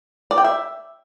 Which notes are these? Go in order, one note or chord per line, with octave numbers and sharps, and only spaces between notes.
D5
G5
E5